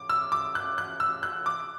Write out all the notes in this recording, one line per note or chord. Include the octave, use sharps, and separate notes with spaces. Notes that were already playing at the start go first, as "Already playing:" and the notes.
Already playing: D6
E6
D6
F#6
F#6
E6
F#6
D6